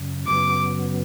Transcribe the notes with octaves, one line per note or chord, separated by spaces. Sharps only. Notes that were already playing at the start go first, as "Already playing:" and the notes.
Already playing: F#2 C#3
F#2 C#3 F#3 B3 D6